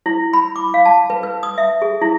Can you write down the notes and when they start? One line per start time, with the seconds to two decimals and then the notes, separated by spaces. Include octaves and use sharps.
0.06 E4
0.33 B5
0.56 D6
0.74 F5
0.85 A5
1.10 B4
1.23 B4
1.43 D#6
1.58 E5
1.82 G#4
2.02 E4